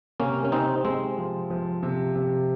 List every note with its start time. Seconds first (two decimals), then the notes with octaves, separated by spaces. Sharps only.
0.20 C3 A#3 C#4
0.45 C#4
0.52 C3 C4 D#4
0.85 C3 G#3 C4
1.18 F3
1.50 F3
1.83 C3
2.16 C3